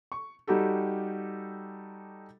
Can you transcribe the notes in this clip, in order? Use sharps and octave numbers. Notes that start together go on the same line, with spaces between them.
C#6
G3 D#4 F#4 G4 A4